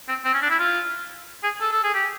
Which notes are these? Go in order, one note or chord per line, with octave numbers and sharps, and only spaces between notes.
C4
C4
C#4
D4
E4
F4
G#4
A4
A4
G#4
G4